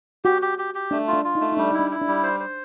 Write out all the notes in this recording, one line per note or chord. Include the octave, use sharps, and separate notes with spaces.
F#4 G4
G4
G4
G4
A3 D4
F4
D4
F4
D#4
A3
D#4
G3 D4
D#4 E4
D4
E4
D4
G3
C5
C5